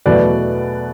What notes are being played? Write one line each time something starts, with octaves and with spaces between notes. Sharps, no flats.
E2 B2 F#3 A3 B4 D5